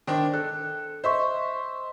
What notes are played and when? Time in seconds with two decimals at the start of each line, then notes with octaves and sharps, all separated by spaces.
0.07 D#3 D4 C5
0.34 A4 F#6
1.04 C5 D#5 E5 C6 C#6